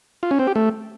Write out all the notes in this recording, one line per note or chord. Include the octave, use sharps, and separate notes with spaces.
F4
C#4
C4
G4
A3